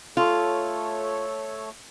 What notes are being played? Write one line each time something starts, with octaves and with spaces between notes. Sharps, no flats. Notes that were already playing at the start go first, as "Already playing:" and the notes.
A3 F4 A4 C#5